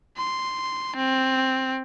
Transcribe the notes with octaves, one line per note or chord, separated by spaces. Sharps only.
C6
C4